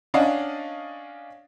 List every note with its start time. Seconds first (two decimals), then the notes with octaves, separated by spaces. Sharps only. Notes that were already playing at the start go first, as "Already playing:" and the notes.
0.14 C#4 D4 D5 D#5 F5 F#5